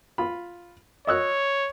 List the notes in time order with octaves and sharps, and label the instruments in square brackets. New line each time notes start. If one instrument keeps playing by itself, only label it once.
[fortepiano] F4 B5
[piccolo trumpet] C#5 [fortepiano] D#5 E6 F#6